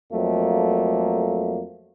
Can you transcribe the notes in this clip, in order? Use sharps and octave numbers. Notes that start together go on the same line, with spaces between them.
F2 F#3 A3 A#3